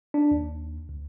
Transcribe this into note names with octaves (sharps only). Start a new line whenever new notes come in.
D4
D#2
D2